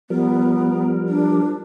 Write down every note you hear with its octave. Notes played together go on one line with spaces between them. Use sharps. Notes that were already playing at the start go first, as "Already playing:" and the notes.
F3 G3 B3 A#4
D4